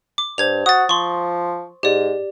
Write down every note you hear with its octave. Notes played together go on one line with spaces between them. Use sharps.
D6
G2 C5 G#6 F7
F#4 D#6 A6
F3 C6 C#6
G#2 G4 D5